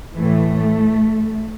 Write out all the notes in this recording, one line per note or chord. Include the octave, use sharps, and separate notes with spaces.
A2 E3 A3